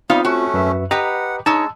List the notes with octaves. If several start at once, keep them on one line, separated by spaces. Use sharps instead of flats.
G3 B3 C4 D#4 F4 F5
A3 C#4 F#4
F#2 B4 E5
G4 B4 D#5 F#5 A#5 D#6
G#3 D#4 C#5 A5 E6